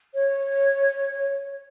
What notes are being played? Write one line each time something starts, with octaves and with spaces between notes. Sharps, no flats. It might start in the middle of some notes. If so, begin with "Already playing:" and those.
C#5